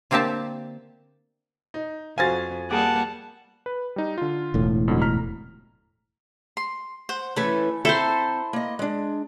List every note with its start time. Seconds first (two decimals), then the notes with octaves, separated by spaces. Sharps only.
0.11 D3 A#3 C4 G4 E5 A5
1.74 D#4
2.18 F2 F#4 C5 F5 G#5 G#6 A6
2.71 G3 A#3 G#4 F#5 A5 D6
3.66 B4
3.96 G3 D#4
4.18 D3 F4
4.54 E1 A2
4.88 F2 D3 F#3
5.01 A#5 F6 B6
6.57 C6
7.09 C5 F#5
7.36 E3 A3 C#4 A4 G#5 B5
7.85 C4 E4 A4 C5 A5 A#5
8.53 A#3 D#5
8.79 G#3 D4